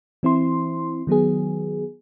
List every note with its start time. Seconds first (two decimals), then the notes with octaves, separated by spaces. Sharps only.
0.23 E3 C4 E4 C6
1.07 D#3 F#3 B3 G#4